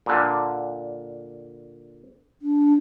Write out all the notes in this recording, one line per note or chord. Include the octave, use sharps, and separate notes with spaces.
A#2 D3
D4